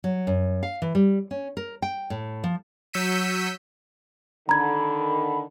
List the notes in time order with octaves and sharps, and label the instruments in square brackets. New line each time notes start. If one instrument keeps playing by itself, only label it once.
[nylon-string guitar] F#3
F#2
F5
E3
G3
C#4
A#4
G5
A2
F3
[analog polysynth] F#3 E6 G6 B6 C#7 D#7
[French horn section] D3 D#3 [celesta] A#5 G#6 [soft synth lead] B5